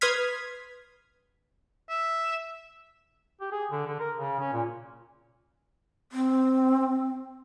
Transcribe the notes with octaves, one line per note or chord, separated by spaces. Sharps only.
B4 C6 D#6 F6 G#6 B6
E5
G4
G#4
D3
D3
A#4
C#3
C#4
A#2
C4